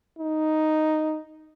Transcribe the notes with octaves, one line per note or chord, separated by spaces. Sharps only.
D#4